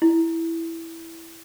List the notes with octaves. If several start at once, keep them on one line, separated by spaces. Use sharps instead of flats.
E4